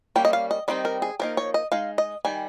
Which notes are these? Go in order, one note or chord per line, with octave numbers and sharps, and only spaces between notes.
G3 A#3 C#4 G5
D#5
F5
D#5
D#3 G3 C4 D#4 D#5
A#4
G#4
F3 A#3 D#4 A#4
C#5
D#5
G#3 D#4 F5
D#5
D#3 G3 G#5